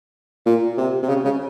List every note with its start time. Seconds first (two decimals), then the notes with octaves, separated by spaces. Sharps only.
0.46 A#2
0.78 C3
1.03 C3
1.09 C#3
1.24 C#3